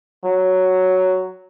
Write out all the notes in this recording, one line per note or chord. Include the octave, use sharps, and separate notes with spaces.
F#3